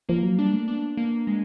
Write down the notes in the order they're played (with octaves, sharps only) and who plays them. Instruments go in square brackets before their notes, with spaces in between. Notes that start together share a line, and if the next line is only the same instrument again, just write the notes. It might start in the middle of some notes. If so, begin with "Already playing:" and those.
[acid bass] F3 [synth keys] A#3
[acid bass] F#3
[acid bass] G3 [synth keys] D4
[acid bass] A3
[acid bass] B3 [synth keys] D4
[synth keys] A#3
G#3